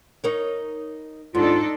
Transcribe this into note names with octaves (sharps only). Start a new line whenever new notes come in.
D#4 A#4 C#5
G#2 D4 D#4 F4 A4